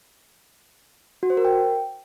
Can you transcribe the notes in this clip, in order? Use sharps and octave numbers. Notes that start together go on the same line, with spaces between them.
F#4
C5
A#4
G5